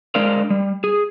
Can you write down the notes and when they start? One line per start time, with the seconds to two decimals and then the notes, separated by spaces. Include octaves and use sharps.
0.15 G#3 D4 A#4 C5 D5 F5
0.50 G3
0.84 G#4